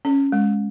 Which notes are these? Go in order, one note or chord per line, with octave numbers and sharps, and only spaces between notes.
C#4
G#3